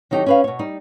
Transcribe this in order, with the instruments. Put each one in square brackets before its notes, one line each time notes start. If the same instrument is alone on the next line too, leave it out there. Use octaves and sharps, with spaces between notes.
[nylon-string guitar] D#3 F#3 D#4 G4 A4
C#4 B4 F5
B2 C#5
G3 D#4